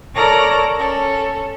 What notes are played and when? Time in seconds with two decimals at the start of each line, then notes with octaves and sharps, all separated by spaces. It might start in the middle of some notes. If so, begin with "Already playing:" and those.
0.15 A4 A#4 C#5 D5 A#5 A#6
0.76 C#4 A4